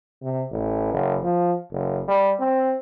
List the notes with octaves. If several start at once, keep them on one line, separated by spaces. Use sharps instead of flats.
C3
A1
F#1
F3
F#1
G3
C4